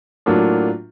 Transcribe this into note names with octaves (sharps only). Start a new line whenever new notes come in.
A2 F#3 A#3 D4 F4